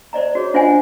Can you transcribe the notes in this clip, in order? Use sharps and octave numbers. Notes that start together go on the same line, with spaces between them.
C5 D5 D#5 A#5
F#4 G#4 C#5
D4 F4 C5 D#5 F#5 G#5